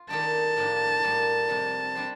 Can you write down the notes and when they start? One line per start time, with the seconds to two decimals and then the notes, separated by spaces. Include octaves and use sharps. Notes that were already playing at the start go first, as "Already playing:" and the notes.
Already playing: F4
0.10 D#3 A3 D#4 G4 D5 A5
0.57 A2 F3 A#3 D4 G4
1.03 A2 G3 A#3
1.49 F2 C3 G3
1.95 G3 D4 G4 C5